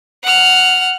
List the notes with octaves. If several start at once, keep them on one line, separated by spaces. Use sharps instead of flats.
F#5 F6